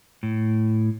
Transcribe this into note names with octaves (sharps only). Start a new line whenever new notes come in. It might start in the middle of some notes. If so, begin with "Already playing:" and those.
A2